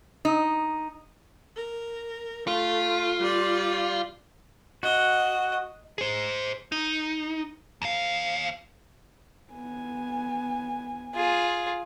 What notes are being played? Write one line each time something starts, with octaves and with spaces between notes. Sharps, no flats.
D#4
A#4
A3 F4
G3 D5
F#4 D#5
G#4 C5
D#4
D#2 F5
B3 G#5
F4 G#4